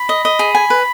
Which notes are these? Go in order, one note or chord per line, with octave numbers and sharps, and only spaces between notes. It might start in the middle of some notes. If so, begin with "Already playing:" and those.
Already playing: B5
D#5
D#5
G#4
G#5
B4